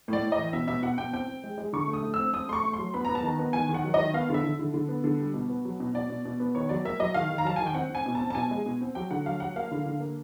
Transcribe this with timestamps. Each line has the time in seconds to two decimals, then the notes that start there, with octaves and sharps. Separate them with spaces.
0.08 A2 D5
0.22 A2
0.32 D#5
0.38 E3
0.53 B2 E5
0.67 B2 E5
0.83 B2 F#5
0.98 B2 G5
1.13 C4 G5
1.27 C4
1.44 G#3
1.58 G#3
1.73 D3 C#6
1.88 A3
1.93 D#6
2.03 A3
2.14 C4 E6
2.33 C4 D#6
2.48 A3 C6
2.53 C#6
2.63 A3
2.73 C6
2.79 F#3
2.94 B3 B5
3.05 B3 A#5
3.15 A5
3.23 D#3 A#5
3.39 B3
3.53 D#3 G#5
3.69 D#3
3.74 F#5
3.84 F#3
3.94 D#5
3.99 D#3
4.14 B3 F5
4.30 D3 E5
4.44 D3
4.59 D3
4.74 D3
4.89 B3
5.04 D3
5.20 G3
5.34 B2
5.49 B3
5.65 F#3
5.80 B2
5.94 B2 D5
6.10 B2
6.25 B2
6.40 B3
6.55 D#3 C#5
6.69 F#3 D5
6.85 A#3 E5
7.00 F#3 D#5
7.14 D#3 F5
7.30 D#3
7.38 A#5
7.45 F#3 A5
7.56 D#3 G#5
7.66 G5
7.75 C4 F#5
7.90 C4 G#5
8.06 B2
8.15 A5
8.21 C4
8.30 A5
8.35 B2 G#5
8.51 G#3
8.66 B2
8.81 C4
8.95 F#3 G5
9.11 D3 F#5
9.26 F#3 F5
9.40 F#3 F#5
9.56 A#3 F5
9.71 D3
9.86 D3
10.00 A#3